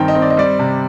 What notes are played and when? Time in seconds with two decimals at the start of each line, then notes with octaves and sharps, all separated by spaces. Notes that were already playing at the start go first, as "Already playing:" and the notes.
Already playing: G2 D#3 C4 G5 A#5
0.08 D#5
0.15 C4
0.22 D5
0.30 D#5
0.37 G3 D5
0.59 C3